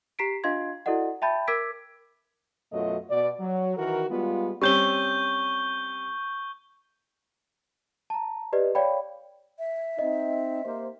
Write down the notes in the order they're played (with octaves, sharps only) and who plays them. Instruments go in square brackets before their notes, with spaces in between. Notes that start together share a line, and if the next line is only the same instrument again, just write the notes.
[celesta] G4 A#5 B6 C7 D7
D4 F4 D#5 F5 C6 G#6
E4 F#4 A4 D5 D#5 F#5
E5 G5 A5 B5 G6 A6
A#4 D6 E6 G#6 B6 D7
[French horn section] F#2 B2 F#3 A3 F4 D#5
B2 D5
F#3
D#3 E3 F#4 A#4
G3 G#3 B3 F4
[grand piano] G3 C4 C#4 [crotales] C#6 G6 G7
[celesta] A5 A#5
G4 B4 D5 D#5
C#5 D5 F5 G5 B5
[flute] E5
[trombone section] C4 D#4 [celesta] D#5
[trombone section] A#3 G4 C5